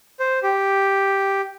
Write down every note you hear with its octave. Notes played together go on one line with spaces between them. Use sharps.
C5
G4